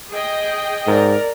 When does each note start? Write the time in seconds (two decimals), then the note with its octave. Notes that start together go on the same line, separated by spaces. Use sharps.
0.11 G#4 D#5 G5
0.87 G#2 A#4 D5